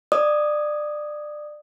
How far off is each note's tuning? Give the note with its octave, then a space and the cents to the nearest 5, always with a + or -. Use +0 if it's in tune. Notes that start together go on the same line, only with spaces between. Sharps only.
D5 +25 D#6 +0